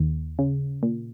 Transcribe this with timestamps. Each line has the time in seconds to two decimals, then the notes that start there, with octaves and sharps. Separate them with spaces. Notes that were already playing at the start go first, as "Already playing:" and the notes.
Already playing: D#2
0.39 C#3
0.83 A#2